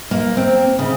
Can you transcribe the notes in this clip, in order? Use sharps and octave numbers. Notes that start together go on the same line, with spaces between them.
A#3
C4
C#3